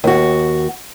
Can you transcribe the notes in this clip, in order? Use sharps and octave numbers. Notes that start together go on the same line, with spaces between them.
D#2 F#4